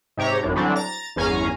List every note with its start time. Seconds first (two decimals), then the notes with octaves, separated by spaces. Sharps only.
0.17 G#2 C3 G4 C#5 A#5
0.43 A1 F#2 D4
0.55 D3 E3 F#3 G3 C4 D4
0.76 A#5 A6
1.16 G1 E2 C#4 F5 G#5 A#5